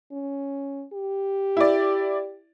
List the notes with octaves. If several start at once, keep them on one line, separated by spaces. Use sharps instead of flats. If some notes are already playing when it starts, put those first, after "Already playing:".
C#4
G4
E4 D5